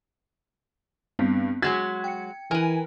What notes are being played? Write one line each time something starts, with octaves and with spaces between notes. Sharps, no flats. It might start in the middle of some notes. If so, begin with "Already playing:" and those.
G2 B3 C4
F#3 G#3 F#4 G#6 B6
G5 C#7
E3 A#4 B4 G#5